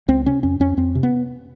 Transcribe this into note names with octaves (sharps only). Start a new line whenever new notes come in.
C#2 C4
C3 C#4
F2 C#4
F2 C#4
F2 C4
C3
B3